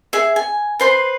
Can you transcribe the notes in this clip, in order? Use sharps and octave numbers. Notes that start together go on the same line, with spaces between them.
G#4 E5
G#5
B4 C5 C6